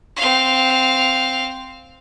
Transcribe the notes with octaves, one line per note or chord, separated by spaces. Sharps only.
C4 F5